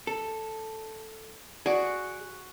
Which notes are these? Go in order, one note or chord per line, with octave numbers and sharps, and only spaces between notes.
A4
F#4 G#4 D5